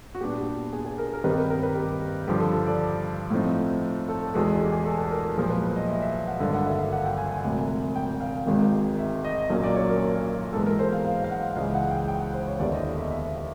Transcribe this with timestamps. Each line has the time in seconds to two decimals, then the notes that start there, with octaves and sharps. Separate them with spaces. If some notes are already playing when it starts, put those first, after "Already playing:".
0.15 F#4
0.21 A#2 G3 B3 D4 G4
0.38 G4
0.73 G#4
0.86 G#4
0.98 A#4
1.14 A#4
1.24 G2 D#3 G3 C4 D#4 B4
1.37 B4
1.50 A#4
1.63 B4
1.75 G4
2.28 G2 D3 F3 G4
2.40 A4
2.67 D5
3.30 A2 F3 A3 C4 D#4
4.08 A4
4.34 E2 B2 G#3 B3 A4
4.47 G#4
4.60 G4
4.72 G#4
4.86 A4
5.11 A#4
5.37 B1 A#2 F3 G#3 A#4
5.50 B4
5.64 B4
5.76 D#5
5.89 E5
6.02 E5
6.15 F5
6.27 F#5
6.40 G#1 G2 D3 F5
6.54 F#5
6.67 E5
6.79 F5
6.92 F#5
7.05 G5
7.18 G#5
7.31 G#5
7.44 E1 D2 C3
7.95 G5
8.21 F5
8.46 G#1 G#2 D#3 G#3 C4
8.99 E5
9.24 D#5
9.50 B1 A#2 F#3 A#3 C#4 D#5
9.64 D5
9.76 C#5
9.89 A#4
10.53 G#2 E3 G#3 B3 A4
10.66 A#4
10.79 C5
10.92 F5
11.05 F5
11.24 F5
11.31 F#5
11.56 C#2 C#3 E3 G#3 C#4 F5
11.74 F#5
11.91 G5
12.08 G5
12.21 F#5
12.34 C5
12.47 C#5
12.59 D#2 D3 G3 B3 E4 D5
12.73 D#5
12.85 D#5
12.99 E5
13.11 E5
13.38 E5